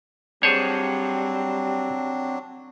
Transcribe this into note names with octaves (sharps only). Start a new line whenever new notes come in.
F#3 G3 C4 D4 G#4 C5 C#5 A5